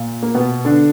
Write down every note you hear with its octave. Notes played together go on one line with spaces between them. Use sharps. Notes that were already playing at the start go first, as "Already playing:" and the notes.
Already playing: A#2
A#3
B2 B3
D3 D4